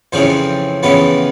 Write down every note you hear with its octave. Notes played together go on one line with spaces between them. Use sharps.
F2 C#3 E3 C4 C5
F2 C#3 E3 B3 B4